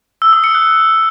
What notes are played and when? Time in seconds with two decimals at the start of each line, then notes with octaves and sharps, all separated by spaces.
0.22 E6
0.33 D#6
0.44 C#7
0.55 F#6